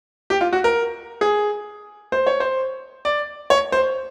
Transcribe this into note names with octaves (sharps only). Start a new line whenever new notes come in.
G4
F4
F#4
A#4
G#4
C5
C#5
C5
D5
C#5
C5